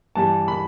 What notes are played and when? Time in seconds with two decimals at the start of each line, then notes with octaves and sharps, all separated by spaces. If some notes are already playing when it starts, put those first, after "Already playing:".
0.15 G2 E3 G3 A5
0.48 B5